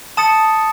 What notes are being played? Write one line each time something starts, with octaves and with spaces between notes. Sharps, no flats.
A5 D#6 A6 C#7